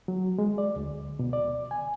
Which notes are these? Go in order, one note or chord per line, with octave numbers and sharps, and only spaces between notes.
F#3
G#3
D5
D2
B2
D5
G#5